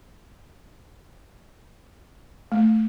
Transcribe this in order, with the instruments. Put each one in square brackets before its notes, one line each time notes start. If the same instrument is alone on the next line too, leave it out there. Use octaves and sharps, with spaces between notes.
[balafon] A3